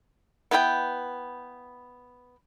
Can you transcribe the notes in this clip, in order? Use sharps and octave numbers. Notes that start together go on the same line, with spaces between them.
B3 E4 B4 G5